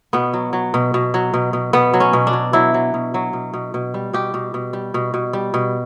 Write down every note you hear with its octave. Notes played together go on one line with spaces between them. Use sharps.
B2 B3
F#3
F#3
B2
B2
F#3
B2
B2
B2 B3
F#3
C#4
B2
D4
F#3
F#3 E4
F#3
B2
F#3
B2
B2
B2
G3
B2 G4
B2
B2
G3
B2
B2
G3
B2